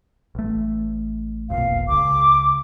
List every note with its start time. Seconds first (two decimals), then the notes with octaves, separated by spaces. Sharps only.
0.35 A1 A3
1.50 F1 B1 A#2 F5
1.88 C#2 C#3 D6